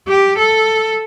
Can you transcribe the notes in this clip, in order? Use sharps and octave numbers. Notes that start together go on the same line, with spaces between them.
G4
A4